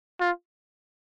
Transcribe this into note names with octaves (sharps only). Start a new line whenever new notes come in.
F4